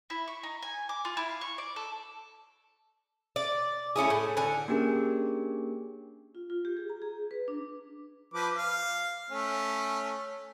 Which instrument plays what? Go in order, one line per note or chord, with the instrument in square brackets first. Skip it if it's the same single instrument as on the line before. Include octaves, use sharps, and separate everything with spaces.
[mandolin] E4
C#6
D#4
G#5
D6
F4
E4
F5
C#6
D5
A4
[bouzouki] D5
A3 C#4 E4 G#4
A2
D3 G#5
[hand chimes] A#3 C#4 D4 G4 G#4 A#4
[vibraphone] F4
F4
G4
G#4
A#5
G#4
B4
D4
[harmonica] F3 B4 D6
F5
A3 C#4